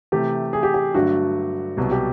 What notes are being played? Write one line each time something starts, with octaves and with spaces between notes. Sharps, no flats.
C3 E3 A3 G4
G#4
G4
G4
G2 D3 F#3 A3 D4 F#4
C2 B2 F#3 G4
G4